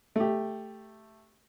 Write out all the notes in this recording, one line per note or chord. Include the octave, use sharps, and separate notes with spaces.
A3 G4